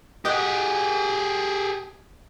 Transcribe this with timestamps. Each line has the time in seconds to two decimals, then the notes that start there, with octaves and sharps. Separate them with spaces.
0.25 G4 G#4 D#5 F#5